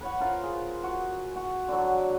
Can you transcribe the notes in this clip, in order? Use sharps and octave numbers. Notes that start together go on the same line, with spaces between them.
B4 C#5 F#5
F4 A#4 C5 F5
G#4
F#4
F#4
D3 F#3